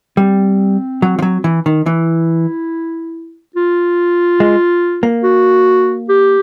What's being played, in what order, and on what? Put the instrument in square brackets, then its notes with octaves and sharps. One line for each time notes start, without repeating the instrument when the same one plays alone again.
[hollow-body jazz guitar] G3 [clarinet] C4
[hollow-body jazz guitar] F#3
F3
F#3
E3
D#3
[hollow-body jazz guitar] E3 [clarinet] E4
[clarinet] F4
[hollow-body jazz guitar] G#3
A#3
[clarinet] F#4
G4